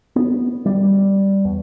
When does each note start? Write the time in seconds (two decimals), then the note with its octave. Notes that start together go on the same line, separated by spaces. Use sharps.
0.16 B3
0.66 G3
1.45 E2